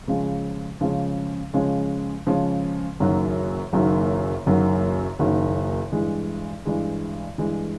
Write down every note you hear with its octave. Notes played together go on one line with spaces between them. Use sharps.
C#3 F3 G#3 C#4
C#3 F3 G#3 C#4
C#3 F3 G#3 C#4
C#3 F3 G#3 C#4
F#1 F#2 D#3 F#3 A#3
F#1 F#2 D#3 F#3 A#3
F#1 F#2 D#3 F#3 A#3
F#1 F#2 D#3 F#3 A#3
G2 E3 G#3
G2 E3 G#3
G2 E3 G#3